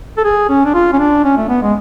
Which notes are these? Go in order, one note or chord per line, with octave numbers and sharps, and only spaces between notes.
A4
G#4
C#4
D4
F4
C#4
D4
C#4
A3
B3
G#3